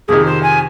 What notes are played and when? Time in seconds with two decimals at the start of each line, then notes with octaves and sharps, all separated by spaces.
0.08 F2 C3 D#3 G#4
0.25 C5
0.43 G#5